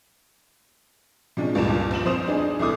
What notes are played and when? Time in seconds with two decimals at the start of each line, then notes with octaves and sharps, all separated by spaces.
1.37 C3 F3 G#3 C#4 D4
1.55 C#2 G2 A#2 E7
1.91 A#1 F3 E7 F#7
2.05 F2 C5 D#6 E7 F7
2.26 B3 D4 D#4 G#4
2.59 C2 E3 A3 D6 D#6